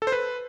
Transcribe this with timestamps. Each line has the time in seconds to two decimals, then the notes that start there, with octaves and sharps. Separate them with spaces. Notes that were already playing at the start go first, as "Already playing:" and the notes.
0.02 A4
0.07 C5
0.12 B4